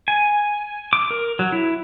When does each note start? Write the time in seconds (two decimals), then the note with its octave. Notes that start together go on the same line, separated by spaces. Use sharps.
0.08 G#5
0.93 D6
1.11 A#4
1.39 F#3
1.52 E4